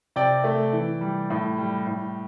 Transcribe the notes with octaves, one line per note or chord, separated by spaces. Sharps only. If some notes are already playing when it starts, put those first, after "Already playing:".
C3 D5 G5
A3
E3
G3
A2
G3
A2